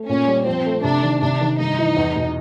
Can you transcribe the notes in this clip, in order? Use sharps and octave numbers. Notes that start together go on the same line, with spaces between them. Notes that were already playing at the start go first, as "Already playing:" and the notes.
Already playing: A3
A#2 C#4
G3
F3 C4
A3
C3 D4
D#3
C3 D4
D#3
G2 D#4
E3
E2
B2